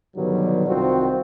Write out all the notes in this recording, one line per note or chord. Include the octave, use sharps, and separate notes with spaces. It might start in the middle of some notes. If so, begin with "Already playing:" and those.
G2 B2 D3 D#3 F#3 G3
C2 D#3 C4 F4 F#4 C5